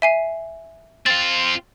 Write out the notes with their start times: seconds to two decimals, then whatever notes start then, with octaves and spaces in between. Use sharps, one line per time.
0.02 E5 G#5 C7
1.06 C4 F4 A6